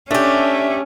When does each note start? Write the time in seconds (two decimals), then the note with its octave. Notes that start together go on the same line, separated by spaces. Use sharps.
0.11 A3 C#4 D4 G4 E5